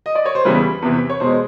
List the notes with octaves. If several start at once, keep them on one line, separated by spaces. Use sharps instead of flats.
D#5
D5
C#5
C5
E2 C#3 E3 G3 B4
E2 C3 E3
C#5
E2 B2 G#3 C5